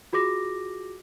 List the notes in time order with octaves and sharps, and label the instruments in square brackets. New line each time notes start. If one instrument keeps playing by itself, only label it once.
[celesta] F4 F#4 G#4 D6 A#6